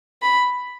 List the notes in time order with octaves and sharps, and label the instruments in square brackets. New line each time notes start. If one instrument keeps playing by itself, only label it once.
[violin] B5